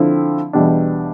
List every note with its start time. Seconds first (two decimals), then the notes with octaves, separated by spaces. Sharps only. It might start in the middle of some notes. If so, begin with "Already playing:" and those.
Already playing: D3 F3 C4 E4
0.53 E2 B2 G3 D4